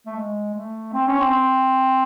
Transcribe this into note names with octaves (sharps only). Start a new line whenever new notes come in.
A3
G#3
A3
C4
C#4
C4